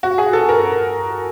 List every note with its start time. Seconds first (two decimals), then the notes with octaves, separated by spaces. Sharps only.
0.03 F#4
0.18 G#4
0.33 A4
0.49 A#4